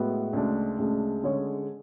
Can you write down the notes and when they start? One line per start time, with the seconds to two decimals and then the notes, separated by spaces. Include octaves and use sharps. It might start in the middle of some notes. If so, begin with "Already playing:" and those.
Already playing: A2 G#3 B3 F#4 B4
0.33 D2 C#3 G#3 D4
0.78 D2 C#3 G#3 D4
1.24 D3 G#3 C#4 G#4 C#5